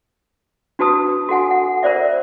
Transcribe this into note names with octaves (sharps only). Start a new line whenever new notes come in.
D4 F#4 B4 A5 D#6
F#4 A4 F#5 G#5
F#5
A#4 C5 D5 E5